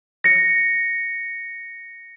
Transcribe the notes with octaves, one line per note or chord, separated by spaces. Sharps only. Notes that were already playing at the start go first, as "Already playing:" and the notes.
A#6 C#7